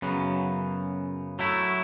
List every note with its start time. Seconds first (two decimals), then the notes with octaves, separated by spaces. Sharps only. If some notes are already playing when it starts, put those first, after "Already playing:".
0.02 F#2 C#3 F#3 B3
1.39 F#3 A3 E4